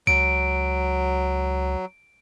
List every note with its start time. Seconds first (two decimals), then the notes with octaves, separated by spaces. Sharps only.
0.07 C#2 F#3 D7